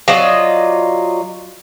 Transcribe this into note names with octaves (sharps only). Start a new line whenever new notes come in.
F#3 F4 D5 D#5